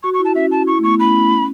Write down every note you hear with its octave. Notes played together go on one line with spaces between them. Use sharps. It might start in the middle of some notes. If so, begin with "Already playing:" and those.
F#4 C#6
C#6
E4
A5
C#4 E5
E4 A5
E4 C#6
A3
B3 C#6
C#4 B5
E4
C#4